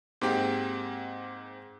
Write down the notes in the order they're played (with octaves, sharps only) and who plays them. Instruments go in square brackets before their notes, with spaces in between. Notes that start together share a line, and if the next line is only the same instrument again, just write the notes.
[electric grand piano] G#2 G#3 A#3 C4 G4